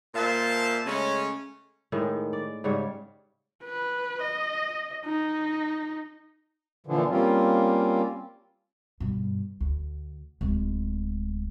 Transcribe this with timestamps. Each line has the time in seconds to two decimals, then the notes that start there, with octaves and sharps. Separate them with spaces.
0.15 A#2 C5 E5 F5 A5
0.86 C#3 G#3 A3 C#4
1.92 A2 D#3 G#3
2.33 D5
2.64 G#2 C#3 G3 C#5
3.63 B4
4.22 D#5
5.05 D#4
6.87 A#2 D3 E3 F3
7.10 G3 A#3 C4 C#4 F4
9.00 G2 B2
9.60 D2
10.41 D1 G#3